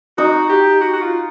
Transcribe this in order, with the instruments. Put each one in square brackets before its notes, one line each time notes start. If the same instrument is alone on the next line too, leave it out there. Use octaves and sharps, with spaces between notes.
[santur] D#4 [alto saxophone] F#4
[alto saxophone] G4
F#4
F#4
F4